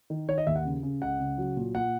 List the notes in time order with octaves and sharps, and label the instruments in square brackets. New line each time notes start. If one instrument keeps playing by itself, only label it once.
[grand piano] D#3
D#3 C#5
D#5
D#2 E5
F#5
C#3
C#3
C#2 F#5
C#3
F#3
A#2
A#2 F#5